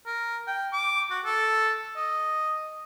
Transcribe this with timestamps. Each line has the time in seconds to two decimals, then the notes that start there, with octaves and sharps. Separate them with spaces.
0.06 A#4
0.47 G5
0.73 D6
1.10 F#4
1.25 A4
1.96 D#5